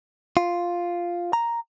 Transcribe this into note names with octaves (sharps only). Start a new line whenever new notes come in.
F4
A#5